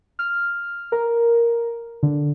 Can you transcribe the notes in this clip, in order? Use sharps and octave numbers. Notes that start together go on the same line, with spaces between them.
F6
A#4
D3